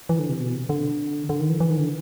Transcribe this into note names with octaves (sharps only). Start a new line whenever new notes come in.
E3
D3
C3
B2
C3
D3
D3
D#3
E3
E3
D#3
D3